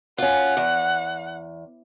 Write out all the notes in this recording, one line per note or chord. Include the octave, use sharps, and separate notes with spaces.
C#4 F4 F#5
E2